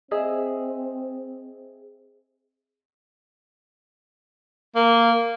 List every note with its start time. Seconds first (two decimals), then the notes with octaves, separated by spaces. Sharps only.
0.11 C4 G#4 D#5 E5
4.76 A#3